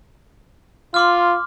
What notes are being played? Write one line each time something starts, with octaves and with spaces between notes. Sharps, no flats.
F4 C6 D6 F6